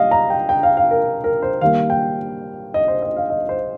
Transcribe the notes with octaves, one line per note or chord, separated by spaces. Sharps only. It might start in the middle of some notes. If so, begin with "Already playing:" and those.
Already playing: G3 A#3 D#5 F5
A#5
G5
G5
F5
F5
A#4
A#4
C5
D#3 G3 A#3 F5
G5
D#5
C5
D#5
F5
D#5
C5